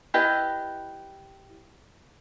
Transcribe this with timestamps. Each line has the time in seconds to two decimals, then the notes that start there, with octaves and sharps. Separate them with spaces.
0.14 E4 G4 B4 D#5